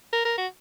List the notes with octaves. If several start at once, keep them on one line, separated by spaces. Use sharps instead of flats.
A#4
A#4
F#4